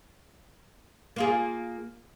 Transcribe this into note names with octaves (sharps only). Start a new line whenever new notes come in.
A#3 F4 G#4